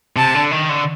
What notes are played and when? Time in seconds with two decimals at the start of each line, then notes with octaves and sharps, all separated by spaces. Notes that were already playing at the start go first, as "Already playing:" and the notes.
0.16 C3 A5
0.34 D3
0.51 D#3
0.69 D3